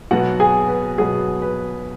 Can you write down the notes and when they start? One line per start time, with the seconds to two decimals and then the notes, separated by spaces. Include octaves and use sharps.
0.11 B2 F#3 B3 F#4 F#5
0.40 G#4 G#5
0.69 B4
0.98 B2 F#3 B3 G#4
1.42 B4